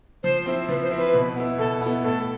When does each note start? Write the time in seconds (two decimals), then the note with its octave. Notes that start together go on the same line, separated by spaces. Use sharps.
0.23 F3 C5
0.46 C4 E4
0.69 F3 B4
0.83 C5
0.91 C4 E4
0.99 B4
1.14 B2
1.36 B3 E4
1.58 B2 A4
1.81 B3
1.86 E4
2.04 A2 A4